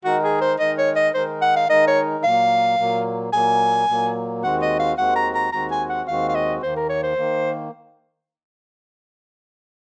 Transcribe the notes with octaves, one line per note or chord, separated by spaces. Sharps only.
D#3 G#3 D#4 F#4 A#4
G#4
C5
D#3 G#3 D#4 A#4 D#5
C#5
D#5
D#3 G#3 D#4 A#4 C5
F#5
F5
D#3 G#3 D#4 A#4 D#5
C#5
A#2 F#3 A#3 F5
A#2 F#3 A#3
A#2 F#3 A#3 G#5
A#2 F#3 A#3
D#2 D#3 G#3 C4 F#4 F#5
D#5
F5
D#2 D#3 G#3 C4 F#4 F#5
A#5
A#5
D#2 D#3 G#3 C4 F#4 A#5
G#5
F#5
D#2 D#3 G#3 C4 F#4 F5
F5
D#5
D#2 D#3 A#3 C5
A#4
C#5
C5
D#3 A#3